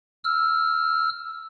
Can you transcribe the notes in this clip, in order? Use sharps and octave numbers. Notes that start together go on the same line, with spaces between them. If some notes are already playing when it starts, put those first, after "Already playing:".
E6 F6